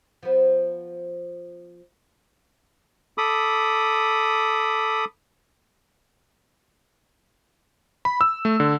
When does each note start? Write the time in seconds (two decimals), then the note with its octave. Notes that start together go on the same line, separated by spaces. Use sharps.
0.23 F3 B3
3.18 A4 B5 D6 D#6
8.05 B5
8.21 E6
8.45 A3
8.60 D3